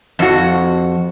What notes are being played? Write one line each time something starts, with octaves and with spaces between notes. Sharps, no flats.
F2 F#4